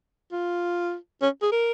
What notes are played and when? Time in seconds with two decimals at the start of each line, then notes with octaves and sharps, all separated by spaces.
0.32 F4
1.22 C#4
1.42 G#4
1.52 A#4